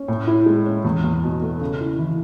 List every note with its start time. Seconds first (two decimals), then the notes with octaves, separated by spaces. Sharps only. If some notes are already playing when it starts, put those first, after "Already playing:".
Already playing: C#4
0.08 A2
0.27 E4
0.46 G#3
0.66 C#4
0.85 E2
1.04 E2
1.23 B2
1.42 A3
1.61 C#3
1.81 E4
1.99 E3